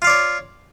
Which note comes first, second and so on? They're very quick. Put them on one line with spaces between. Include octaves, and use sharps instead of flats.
F4 F5 D5 C#5